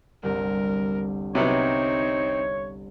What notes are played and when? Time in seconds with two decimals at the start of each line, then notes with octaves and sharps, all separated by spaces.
0.23 G1 C2 A#4
1.35 C3 F#3 B3 C4 D#4 C#5